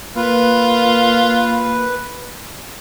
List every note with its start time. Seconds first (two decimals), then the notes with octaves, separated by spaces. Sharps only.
0.16 A#3 F4 B4